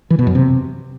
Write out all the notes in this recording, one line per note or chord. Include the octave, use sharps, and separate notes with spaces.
E3
B2
F#2
C3